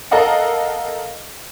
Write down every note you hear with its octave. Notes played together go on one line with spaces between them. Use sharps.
A4 A#4 D#5 F5 F#5